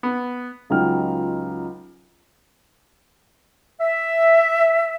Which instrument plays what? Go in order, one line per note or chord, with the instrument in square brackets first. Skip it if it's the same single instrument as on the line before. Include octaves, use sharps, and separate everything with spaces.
[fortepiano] B3
[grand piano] C#2 F#3 D#4 F4 G5 F6
[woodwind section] E5